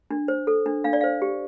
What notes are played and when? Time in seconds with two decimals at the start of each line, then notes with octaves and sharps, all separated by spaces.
0.11 D4
0.28 C5
0.47 A4
0.66 D4
0.84 D4 F5
0.93 D5
1.01 C5 F5
1.22 G4